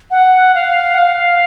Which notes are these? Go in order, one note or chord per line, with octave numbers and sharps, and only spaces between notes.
F#5
F5
F#5
F5